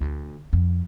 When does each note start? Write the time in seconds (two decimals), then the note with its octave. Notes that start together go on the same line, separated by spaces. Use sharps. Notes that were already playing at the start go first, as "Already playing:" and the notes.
0.01 D2
0.53 F2